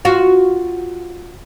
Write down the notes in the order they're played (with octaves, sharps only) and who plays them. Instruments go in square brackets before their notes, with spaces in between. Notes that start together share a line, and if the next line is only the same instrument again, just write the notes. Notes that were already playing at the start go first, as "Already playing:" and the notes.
[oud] F4 F#4